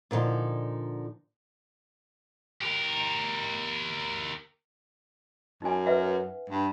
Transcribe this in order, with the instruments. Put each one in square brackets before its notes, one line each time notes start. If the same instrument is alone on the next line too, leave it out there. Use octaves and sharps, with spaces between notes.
[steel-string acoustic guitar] A#2 D3 F3 D#4
[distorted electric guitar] G4 A#4
[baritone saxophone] F#2 [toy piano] D#4 G#5
[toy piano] B4 E5 F#5
[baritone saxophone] G2